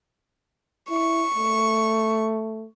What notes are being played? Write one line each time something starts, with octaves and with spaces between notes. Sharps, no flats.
E4 C#6
A3